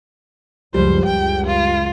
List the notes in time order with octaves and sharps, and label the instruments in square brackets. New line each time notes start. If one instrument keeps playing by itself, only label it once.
[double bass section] C#2 F#2 F3 [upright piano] G3 [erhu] C5
[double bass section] C#2 F#2 [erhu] G5
[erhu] F4